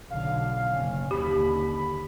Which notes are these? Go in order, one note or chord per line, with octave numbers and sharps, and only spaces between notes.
B1 D3 F5
F#1 C#4
D#2 D3 G4 B5